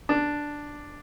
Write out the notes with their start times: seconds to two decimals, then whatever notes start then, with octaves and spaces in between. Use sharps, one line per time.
0.09 D4